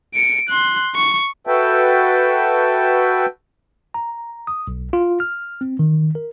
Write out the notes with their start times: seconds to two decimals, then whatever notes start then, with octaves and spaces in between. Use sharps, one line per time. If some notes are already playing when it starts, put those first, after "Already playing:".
0.14 C#7 D7
0.49 C6 F#6
0.95 C#6
1.47 F#4 A4 B4 E5 G5 A5
3.94 A#5
4.47 D#6
4.67 B1
4.93 F4
5.20 F6
5.61 C4
5.79 D#3
6.15 A#4